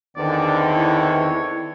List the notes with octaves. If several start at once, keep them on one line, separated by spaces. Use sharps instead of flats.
E2 D3 D#3 C4 D5
E4 C#5